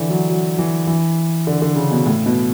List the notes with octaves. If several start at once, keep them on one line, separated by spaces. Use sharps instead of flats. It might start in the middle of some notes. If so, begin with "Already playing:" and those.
Already playing: D3 E3
F#3
F#3
E3
E3
D3
D3
C#3
B2
A2
B2